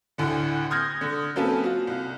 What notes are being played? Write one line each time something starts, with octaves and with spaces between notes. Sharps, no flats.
D2 A2 D3
C6 D#6 F6 G6 G#6 A#6
D3
F#3 A#3 C4 C#4 A4 B4
F4 F#4
C2